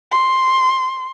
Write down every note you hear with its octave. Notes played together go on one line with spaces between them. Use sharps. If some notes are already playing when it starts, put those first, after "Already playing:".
C6